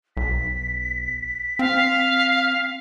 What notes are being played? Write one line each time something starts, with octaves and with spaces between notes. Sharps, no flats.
B1 B6
C4 F5